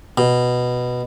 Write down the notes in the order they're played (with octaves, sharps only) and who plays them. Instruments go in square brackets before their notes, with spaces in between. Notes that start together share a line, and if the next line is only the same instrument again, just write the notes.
[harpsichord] B2